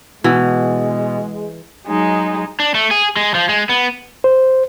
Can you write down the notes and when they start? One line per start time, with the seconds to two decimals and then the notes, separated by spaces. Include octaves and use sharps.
0.24 B2 E3 G#3
1.87 F#3 G#3 D#4
2.60 D4
2.74 A3
2.91 G#4
3.17 G#3
3.35 F3
3.49 G#3
3.69 B3
4.24 C5